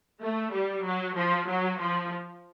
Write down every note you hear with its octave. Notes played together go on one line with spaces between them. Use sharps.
A3
G3
F#3
F3
F#3
F3